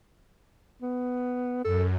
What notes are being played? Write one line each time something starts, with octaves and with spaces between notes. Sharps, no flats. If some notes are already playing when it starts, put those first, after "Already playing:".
B3
F#2 A4